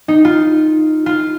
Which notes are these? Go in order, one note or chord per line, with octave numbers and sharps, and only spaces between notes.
D#4
F4
F4